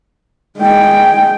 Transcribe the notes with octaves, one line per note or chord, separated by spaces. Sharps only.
G#3 G5